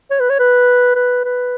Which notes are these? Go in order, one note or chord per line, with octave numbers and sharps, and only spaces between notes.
C#5
B4
C#5
B4
B4
B4